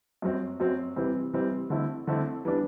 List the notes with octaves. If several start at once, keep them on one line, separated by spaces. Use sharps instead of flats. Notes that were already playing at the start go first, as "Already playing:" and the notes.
F#2 F#3 C4
F#2 F#3 C4
C3 E3 G3 C4
C3 E3 G3 C4
D3 A3 C4 E4
D3 A3 C4 E4
E3 G3 B3 D4